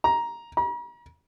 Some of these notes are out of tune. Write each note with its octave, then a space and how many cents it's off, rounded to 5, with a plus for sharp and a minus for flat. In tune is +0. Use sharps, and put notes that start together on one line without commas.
A#5 +10
A#5 +45